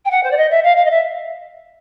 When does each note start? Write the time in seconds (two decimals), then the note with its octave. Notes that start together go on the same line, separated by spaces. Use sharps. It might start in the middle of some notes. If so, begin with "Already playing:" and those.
0.05 G5
0.10 F#5
0.23 C5
0.30 D5
0.37 D#5
0.50 E5
0.63 F5
0.76 F5
0.85 D#5
0.90 E5